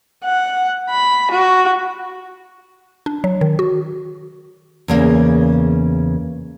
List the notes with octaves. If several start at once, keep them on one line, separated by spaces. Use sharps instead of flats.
F#5
B5
F#4
D4
F#3
D#3
F#4
E2 C#3 A#3